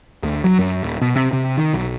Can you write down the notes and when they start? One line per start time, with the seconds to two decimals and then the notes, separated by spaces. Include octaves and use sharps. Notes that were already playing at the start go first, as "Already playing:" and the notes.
0.23 D2
0.44 F#3
0.59 F#2
0.83 D#1
1.01 B2
1.16 C3
1.33 C3
1.57 D#3
1.73 B1